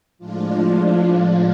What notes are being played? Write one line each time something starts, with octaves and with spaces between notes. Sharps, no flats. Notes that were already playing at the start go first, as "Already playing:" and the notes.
A2 F3 G#3 D4 F4